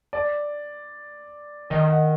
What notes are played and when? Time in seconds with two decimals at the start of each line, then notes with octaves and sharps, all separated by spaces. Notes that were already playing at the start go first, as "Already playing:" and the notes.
0.13 D5
1.70 D#3 D#5
1.90 F#5